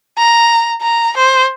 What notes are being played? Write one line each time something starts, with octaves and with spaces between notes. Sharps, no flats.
A#5
A#5
C5